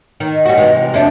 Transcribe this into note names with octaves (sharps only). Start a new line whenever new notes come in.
D#3
D#5
G3 F#4
C3 E3 G#3
F2 D4 E5